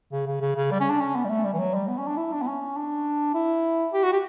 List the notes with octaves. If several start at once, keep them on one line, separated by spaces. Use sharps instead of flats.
C#3
C#3
C#3
C#3
G3
C#4
D4
C#4
B3
G3
A3
G3
E3
F#3
G3
B3
C#4
D4
E4
D4
B3
C#4
D4
E4
G4
F#4
G4